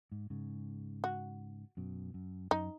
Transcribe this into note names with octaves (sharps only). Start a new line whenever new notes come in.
G#2
G#2 C#3
F#4
F#2 B2
F#2
F#2 D#4